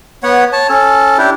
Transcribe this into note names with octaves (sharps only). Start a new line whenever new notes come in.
B3 C#5 F#5
C#5 A5
C#4 A4
D4 E4 G4